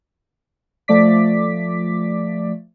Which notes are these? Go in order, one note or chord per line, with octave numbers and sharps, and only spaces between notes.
F3 A3 D5 D6 B6